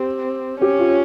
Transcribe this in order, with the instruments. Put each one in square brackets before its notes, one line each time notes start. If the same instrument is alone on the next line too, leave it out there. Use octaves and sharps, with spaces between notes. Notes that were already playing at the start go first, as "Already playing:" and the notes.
Already playing: [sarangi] C4 [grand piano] G4
[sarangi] C#4 [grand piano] G4
[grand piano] F4